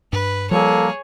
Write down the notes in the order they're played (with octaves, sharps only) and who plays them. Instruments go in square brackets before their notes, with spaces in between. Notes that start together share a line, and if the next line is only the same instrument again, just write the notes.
[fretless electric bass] G2 [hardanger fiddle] B4
[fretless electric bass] F3 G3 [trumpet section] A#3 A4 [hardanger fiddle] G#4 C#5